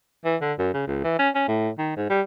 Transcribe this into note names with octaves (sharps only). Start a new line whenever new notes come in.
E3
D3
F#2
C#3
C#2
E3
C#4
C#4
A2
D#3
G#2
G3